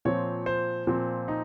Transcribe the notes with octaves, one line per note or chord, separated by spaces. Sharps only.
A#2 F3 C4 C#5
C5
A#2 F3 C4
D#4